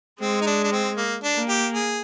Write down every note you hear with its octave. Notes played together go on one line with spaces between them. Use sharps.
G#3 C4
D#4
D4
D4
C4
A#3
D4
A#3
G4
G#4